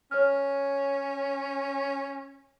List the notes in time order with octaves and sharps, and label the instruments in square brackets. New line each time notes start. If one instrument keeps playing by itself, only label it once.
[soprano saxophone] C#4 [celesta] C#5 F6